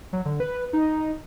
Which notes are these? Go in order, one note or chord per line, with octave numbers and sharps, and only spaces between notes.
F#3
D3
B4
D#4